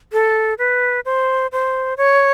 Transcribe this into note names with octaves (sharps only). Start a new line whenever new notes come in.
A4
B4
C5
C5
C#5